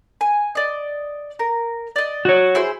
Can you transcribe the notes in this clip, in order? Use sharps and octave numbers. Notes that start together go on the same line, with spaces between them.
G#5
D5 D#5
A#4
D5 D#5
F#4 C#5
E4 G#4 C5